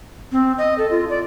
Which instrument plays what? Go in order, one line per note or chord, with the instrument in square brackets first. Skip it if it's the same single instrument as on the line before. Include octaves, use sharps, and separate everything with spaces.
[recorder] C4
D#5
A4
F4
D5